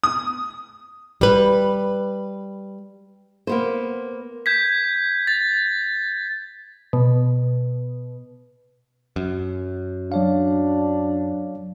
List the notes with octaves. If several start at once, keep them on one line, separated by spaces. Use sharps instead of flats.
D#6
G3 B4
A#3 B3 C5
G6 G#6 B6
A6
B2
F#2
F#3 D4 C#5 F5